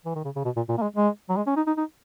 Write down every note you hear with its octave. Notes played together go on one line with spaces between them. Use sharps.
E3
D#3
C#3
C#3
B2
A#2
A#2
A#3
G#3
G#3
F#3
G#3
C#4
D#4
D#4
D#4